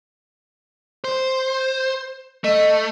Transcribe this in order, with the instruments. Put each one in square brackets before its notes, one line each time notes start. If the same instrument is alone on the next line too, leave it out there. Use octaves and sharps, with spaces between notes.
[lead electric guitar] C5
[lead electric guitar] A3 [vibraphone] D#5